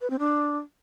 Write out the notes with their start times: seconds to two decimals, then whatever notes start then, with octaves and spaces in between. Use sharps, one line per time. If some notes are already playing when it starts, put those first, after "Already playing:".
0.01 B4
0.10 C4
0.19 D4